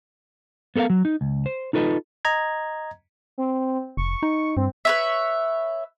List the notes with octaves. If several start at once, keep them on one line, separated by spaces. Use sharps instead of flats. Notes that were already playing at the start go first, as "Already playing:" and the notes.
B3 A4 A#4 D#5 F5
F#3
D#4
C#2
C5
D#4 F4 A4 B4 D#5
D#5 A#5 G#6
C4
F1 C#6
D#4
G2 C4
B4 C#5 E5